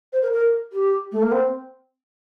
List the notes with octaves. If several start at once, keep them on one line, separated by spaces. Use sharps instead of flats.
C5
A#4
A#4
G4
A3
A#3
C4